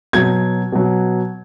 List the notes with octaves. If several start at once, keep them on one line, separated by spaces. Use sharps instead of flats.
B2 F#3 G#6
B2 F#3